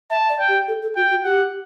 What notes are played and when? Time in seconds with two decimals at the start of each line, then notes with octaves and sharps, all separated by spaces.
0.10 E5 A5
0.29 D5
0.39 G5
0.49 G4
0.68 A4
0.82 A4
0.96 F#4 G5
1.10 F#4
1.24 G4 F#5